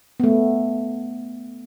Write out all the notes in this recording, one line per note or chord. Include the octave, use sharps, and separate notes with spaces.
A3 B3